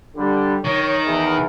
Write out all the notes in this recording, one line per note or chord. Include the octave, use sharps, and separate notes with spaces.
D3 G3
D#3 C#5
E2